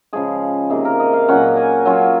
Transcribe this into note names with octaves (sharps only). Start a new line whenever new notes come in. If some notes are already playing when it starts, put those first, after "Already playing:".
C#3 F3 G#3 G#4
C3 D#3 A#3 G#4
A#4
D#5
F5
A#2 F#3 C#4 F4 F#5
G#5
F#3 C#4 F4